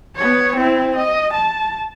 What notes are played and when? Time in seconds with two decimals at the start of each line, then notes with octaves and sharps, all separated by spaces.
0.16 B3 C#5
0.56 C4 E4
0.95 D#5
1.33 A5